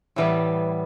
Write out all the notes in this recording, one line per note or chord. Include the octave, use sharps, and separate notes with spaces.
A2 E3 G3 B3